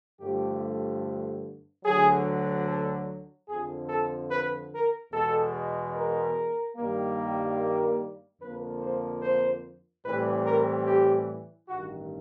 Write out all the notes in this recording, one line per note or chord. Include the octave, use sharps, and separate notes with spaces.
G2 D3 F3 A3 G4
D2 D3 F#3 G#4
A4
F2 D3 F3 G#4
A4
B4
A#4
E2 B2 G#3 A4
A#4
G2 D#3 G3 A#3
F2 D3 F3 A#3 B4
C5
C5
A2 E3 G3 C4 B4
A#4
G4
A1 G2 D#3 F#4